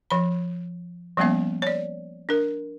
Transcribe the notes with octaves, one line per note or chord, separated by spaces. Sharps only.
F3 B5
F3 G3 A#3 B3 C#4 E5
C#5 D5
D4 A#4